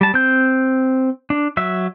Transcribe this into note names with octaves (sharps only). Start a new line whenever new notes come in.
G3 A5
C4 G6
D4
F#3 E5